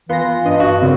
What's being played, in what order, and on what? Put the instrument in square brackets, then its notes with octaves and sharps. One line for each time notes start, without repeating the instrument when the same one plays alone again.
[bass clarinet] E3 [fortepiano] B3 [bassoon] F4 [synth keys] C6 A#6
[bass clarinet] G2 [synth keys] D4 D#5
[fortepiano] F#4
[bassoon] A#2 [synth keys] C#3 C4